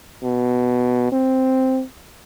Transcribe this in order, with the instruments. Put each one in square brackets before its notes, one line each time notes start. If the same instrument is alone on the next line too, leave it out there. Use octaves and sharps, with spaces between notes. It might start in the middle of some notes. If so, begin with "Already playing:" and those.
[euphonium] B2
C4